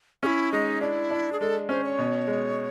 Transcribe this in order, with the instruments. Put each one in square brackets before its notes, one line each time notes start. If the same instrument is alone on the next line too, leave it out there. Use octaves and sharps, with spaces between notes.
[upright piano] C#4 [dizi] G#4
[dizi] E4
[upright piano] G#3 [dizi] D#4
[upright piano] D4 [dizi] E4
[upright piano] D4
[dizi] G#4
[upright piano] G#3 [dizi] A4
[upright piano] C#4 [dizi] C5
[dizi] C#5
[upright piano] B2
G#3